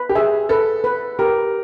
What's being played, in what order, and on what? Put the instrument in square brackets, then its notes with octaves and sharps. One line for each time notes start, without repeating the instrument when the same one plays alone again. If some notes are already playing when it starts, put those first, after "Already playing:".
Already playing: [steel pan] B4
[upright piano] G4
[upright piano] G#4 [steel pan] E5
[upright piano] A4 [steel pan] B4
[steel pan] B4
[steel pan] G4 [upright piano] A#4